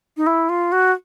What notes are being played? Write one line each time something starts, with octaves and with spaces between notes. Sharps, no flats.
D#4
E4
F4
F#4